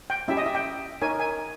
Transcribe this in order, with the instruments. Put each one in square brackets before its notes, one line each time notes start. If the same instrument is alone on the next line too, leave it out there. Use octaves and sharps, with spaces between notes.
[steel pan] G5
C#4 E4 G4 E5
D#5
E5
G5
D#4 A#4 C#5 G#5
G#5